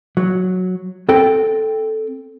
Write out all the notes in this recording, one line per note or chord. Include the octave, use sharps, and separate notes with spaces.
F#3
C4 A4 G5